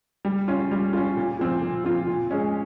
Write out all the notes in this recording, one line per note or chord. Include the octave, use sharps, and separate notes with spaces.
G3
C#4 F4
G3
C#4 F4
A#2
F3 C4 F4
A#2
F3 C4 F4
A#2
G#3 C#4